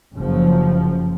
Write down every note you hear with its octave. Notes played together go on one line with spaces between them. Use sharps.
F#1 F3